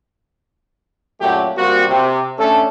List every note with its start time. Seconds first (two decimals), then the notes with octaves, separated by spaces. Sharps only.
1.21 F#2 A#2 F#3 A3 G4
1.57 G3 A#3 C4 F#4
1.88 C3
2.39 A3 C#4 D4 A4